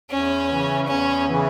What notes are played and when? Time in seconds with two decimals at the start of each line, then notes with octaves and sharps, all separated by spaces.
0.10 E2 C#4
0.49 C#3 E3
0.87 E2 C#4
1.26 C#3 E3